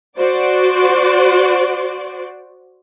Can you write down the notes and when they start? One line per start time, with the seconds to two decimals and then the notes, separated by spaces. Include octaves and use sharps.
0.18 F#4 C5 D5